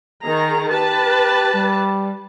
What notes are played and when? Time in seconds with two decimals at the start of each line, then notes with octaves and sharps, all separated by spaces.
0.24 D#3 G#4 A#5
0.72 G4 B4 A5
1.55 G3